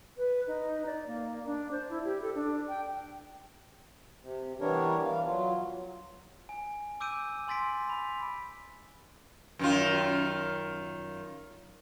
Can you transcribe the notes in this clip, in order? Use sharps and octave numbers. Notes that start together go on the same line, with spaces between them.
B4
D#4
D5
A#3
D4
C5
E4
G4
A4
D4
G5
C3
E3 G3 B3 D4 A#4 C#5
E3 F5
F#3 F4
G#5
D6 E6 G6 D7 D#7
G#5 C6 A6 B6 D7
B5
F#2 D#3 F4